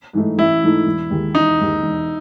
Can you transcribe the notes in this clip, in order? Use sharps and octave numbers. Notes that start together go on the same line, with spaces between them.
G#2 E3 A3 D#4
A1 E4
G#2 E3 A3 D#4
E1
D#2 D#3 G#3
E1 D#4
D#2 D#3 G#3
E1